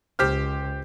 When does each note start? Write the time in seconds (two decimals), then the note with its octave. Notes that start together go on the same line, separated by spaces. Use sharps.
0.19 C#2 G4 C5 F6